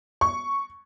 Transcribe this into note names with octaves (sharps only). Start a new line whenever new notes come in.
C#6